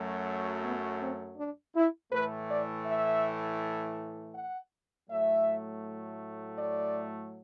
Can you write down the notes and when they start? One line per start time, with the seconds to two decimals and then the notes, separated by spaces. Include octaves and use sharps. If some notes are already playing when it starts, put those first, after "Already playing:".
Already playing: F#2 F#3 A3
0.64 B3
1.00 C4
1.38 D4
1.76 E4
2.12 A2 E3 A3 B4
2.50 D5
2.86 E5
4.35 F#5
5.10 A2 F#3 A3 E5
6.59 D5